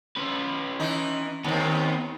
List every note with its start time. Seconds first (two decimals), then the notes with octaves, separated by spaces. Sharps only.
0.16 C#4 B4
0.80 E3 D#4
1.44 D#2 D#3 B3 C4